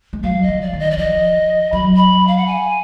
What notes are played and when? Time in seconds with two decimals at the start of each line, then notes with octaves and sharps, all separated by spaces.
0.13 G#3
0.23 F#3 F5
0.43 D#5
0.48 F3
0.61 D5
0.73 D#3
0.79 D#5
0.91 D5
0.97 F3 D#5
1.72 F#3 B5
1.96 B5
2.28 F5
2.37 F#5
2.47 G#5